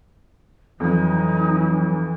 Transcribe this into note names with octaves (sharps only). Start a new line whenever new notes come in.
F2 E3 F#3 D#4